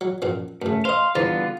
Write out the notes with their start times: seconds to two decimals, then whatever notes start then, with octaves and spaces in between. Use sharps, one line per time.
0.01 F#3
0.22 A#1 F#2 F3
0.62 F#2 C#3 A3
0.85 C5 D#5 F5 C6
1.15 E2 D3 G3 B3 F4 C5 A#5